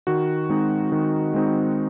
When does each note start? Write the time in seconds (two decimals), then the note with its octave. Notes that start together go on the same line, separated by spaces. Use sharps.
0.07 D#3 F#4
0.49 G#3 C4 D#4
0.92 D#3
1.34 G#3 C4 D#4